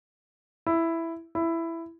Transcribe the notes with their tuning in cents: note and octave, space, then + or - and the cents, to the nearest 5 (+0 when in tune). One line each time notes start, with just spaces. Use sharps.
E4 +5
E4 +10